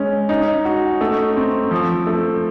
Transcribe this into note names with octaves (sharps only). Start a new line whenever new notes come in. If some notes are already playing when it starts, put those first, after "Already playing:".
Already playing: G#3 C#4
D#4
F#4
A3
C4
F3
A3